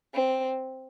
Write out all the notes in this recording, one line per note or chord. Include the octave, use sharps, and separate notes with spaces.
C4